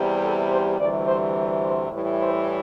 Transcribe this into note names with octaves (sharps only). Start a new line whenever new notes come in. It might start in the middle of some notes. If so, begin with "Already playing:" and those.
Already playing: E2 C3 G3
A4
C5
D2 C3 E3 G3 D5
C5
C5
A2 E3 G3
C5